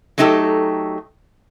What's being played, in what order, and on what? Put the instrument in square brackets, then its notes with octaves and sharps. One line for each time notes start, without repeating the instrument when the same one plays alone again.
[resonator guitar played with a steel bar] F#3 A3 D#4 G4 A4